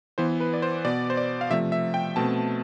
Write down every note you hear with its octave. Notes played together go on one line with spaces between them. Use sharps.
E3 B3 C5
B4
D5
C5
B2 B3 D5
C5
D5
F5
C3 F3 A3 E5
E5
G5
B2 A3 C4 A5